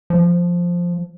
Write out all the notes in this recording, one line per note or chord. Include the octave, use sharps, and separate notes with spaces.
F3